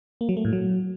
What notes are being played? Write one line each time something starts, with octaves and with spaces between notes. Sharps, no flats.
A#3
F#3
A3
A2
F#3